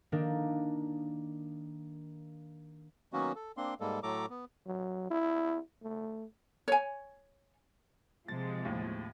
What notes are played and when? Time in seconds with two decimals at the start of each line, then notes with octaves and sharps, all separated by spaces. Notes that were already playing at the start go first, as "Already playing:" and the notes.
0.12 D#3 A#3 D4
3.13 D#3 F#3 A#3 B3 C#4 F#4
3.36 A4
3.57 A#3 C4 D4 C6
3.80 G#2 G3 G#3 A#3 A4
4.03 A2 F#3 A3 A4 A#5 D6
4.30 B3
4.66 F#3
5.10 E4
5.83 A3
6.68 C#5 G#5
8.28 C3 F3 G#3 A6
8.65 D#2 A2